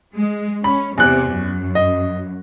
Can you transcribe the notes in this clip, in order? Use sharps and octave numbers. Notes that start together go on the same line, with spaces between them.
G#3
C#4 B5
E2 C3 F#6
F#2
D#5